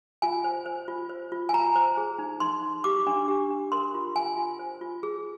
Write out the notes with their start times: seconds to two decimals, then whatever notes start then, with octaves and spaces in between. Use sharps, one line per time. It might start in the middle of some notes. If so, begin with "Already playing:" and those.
0.22 F4 G#5
0.44 C5
0.66 C5
0.88 F4
1.09 C5
1.32 F4
1.49 G#5
1.53 F4 A#5
1.75 C5
1.97 G#4
2.19 D#4
2.40 D#4 C6
2.63 D#4
2.84 G4 D6
3.07 D4
3.28 G4
3.50 D4
3.72 A#4 C6
3.94 F4
4.16 F4 G#5
4.37 F4
4.59 C5
4.81 F4
5.03 G#4